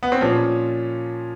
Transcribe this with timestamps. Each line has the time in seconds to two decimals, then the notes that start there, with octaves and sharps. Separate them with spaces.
0.03 B3
0.12 C4
0.21 A#2 F3 C#4